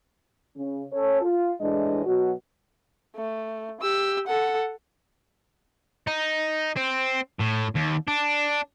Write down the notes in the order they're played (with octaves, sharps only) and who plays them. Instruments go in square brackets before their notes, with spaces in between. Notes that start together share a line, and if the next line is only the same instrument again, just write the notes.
[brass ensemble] C#3
C#4 A4 C#5
F4
A2 E3 G#3 D4 D#5
B2 F#3 F#4
[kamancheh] A3
G4 E6
A4 F#5
[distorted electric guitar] D#4
C4
A2
D#2
D4